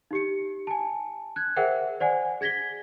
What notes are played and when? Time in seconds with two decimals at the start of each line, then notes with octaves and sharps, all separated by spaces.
0.11 D#4 G4 C#7
0.67 G#5 A5
1.36 F#6 G#6
1.56 G#4 A#4 C5 E5 F#5 G5
2.00 C5 D5 F#5 G#5
2.41 G#4 G#6 A#6 B6 G7